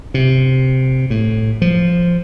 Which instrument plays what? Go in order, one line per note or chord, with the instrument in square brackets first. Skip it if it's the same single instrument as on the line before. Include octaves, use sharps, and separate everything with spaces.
[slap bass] C3
A2
F3